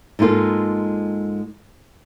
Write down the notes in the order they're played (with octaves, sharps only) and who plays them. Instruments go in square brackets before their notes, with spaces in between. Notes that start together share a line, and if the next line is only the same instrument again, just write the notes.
[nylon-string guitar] G#2 G#3 A#3 F4 A4